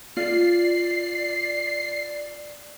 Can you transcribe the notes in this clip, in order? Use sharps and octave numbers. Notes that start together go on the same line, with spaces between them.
F4 D5 C7